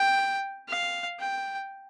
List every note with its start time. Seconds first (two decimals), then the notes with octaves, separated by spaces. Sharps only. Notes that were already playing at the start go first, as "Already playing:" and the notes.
Already playing: G5
0.68 F5
1.20 G5